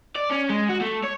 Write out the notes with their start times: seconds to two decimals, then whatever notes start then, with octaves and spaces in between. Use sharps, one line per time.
0.15 D5
0.30 C#4
0.50 G#3
0.69 F#4
0.81 A3
1.04 C#5